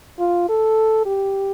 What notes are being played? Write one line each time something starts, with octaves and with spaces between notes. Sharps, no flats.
F4
A4
G4